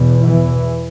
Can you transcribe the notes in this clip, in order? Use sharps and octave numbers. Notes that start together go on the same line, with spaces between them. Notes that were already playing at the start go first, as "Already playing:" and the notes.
Already playing: E2 B2
E3